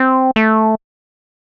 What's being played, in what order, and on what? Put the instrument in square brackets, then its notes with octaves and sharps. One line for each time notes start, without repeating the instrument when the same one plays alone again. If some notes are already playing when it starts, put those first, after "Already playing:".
Already playing: [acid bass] C4
A3